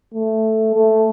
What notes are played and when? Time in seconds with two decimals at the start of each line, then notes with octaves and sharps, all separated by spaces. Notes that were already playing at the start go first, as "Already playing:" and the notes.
0.14 A3
0.74 A3